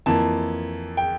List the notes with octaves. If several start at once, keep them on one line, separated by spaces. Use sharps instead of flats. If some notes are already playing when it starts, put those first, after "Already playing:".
F2 E3 A#3 A5
G5